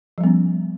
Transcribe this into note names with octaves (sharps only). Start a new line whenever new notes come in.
F3 G3 B3 C#4